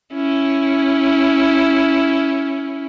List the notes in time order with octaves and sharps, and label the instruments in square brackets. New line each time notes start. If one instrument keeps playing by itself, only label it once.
[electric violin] C#4 E4